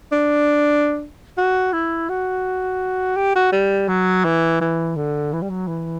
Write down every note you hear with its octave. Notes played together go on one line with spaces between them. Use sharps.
D4
F#4
E4
F#4
G4
F#4
G3
F#3
E3
E3
D3
E3
G3
F#3
E3